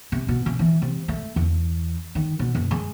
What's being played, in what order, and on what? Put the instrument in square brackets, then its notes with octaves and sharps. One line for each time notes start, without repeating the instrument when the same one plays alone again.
[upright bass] C3
B2
C#3
E3
C3
A3
E2
D#3
B2
F#1
G#3